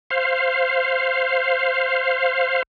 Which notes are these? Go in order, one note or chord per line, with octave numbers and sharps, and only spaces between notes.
C5 F5